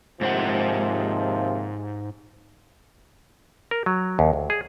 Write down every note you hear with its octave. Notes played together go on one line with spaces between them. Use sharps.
D#2 G#2 C3 F3 C5 F#5
A#4
F#3
D#2
D2
G#4